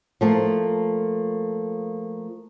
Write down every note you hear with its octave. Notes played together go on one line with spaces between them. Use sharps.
F3 A3 A#3